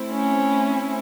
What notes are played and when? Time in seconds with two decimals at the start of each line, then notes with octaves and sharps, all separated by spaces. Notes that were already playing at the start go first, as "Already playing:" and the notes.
Already playing: A3 C4 E4
0.12 C#4